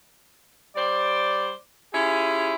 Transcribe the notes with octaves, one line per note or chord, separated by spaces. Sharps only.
G3 C5 D5
C#4 E4 F4 G4 G#4